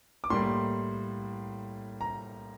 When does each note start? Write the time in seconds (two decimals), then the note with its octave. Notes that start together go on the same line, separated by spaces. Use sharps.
0.24 D6
0.30 A2 G3 A#3 C6
2.01 A#5